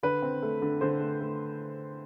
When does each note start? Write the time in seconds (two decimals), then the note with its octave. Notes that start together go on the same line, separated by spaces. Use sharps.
0.03 D3 B4
0.22 C4
0.42 A3
0.62 D3
0.81 D3 C5
1.00 A3
1.20 A3